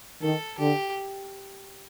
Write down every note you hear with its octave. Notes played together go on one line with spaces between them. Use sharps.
D#3 A4
D3 G4